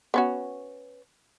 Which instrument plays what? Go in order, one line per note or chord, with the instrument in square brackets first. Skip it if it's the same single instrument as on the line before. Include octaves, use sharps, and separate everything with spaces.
[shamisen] B3 C#4 F#4